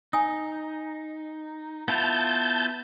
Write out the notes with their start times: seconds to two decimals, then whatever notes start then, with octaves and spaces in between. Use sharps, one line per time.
0.13 D#4 G#5 D#6
1.88 B3 E4 F4 A5 G6